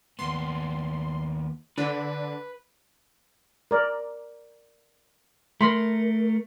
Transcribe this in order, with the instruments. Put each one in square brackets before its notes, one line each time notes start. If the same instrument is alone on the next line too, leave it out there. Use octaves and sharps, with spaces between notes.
[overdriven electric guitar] D#2 B3 [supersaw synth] C6
[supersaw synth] D3 D4 [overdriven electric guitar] B4
[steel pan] A#4 D5
[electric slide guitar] A3 A#4 [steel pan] B5 C6